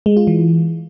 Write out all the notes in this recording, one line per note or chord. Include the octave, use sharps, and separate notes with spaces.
G#3
F4
E3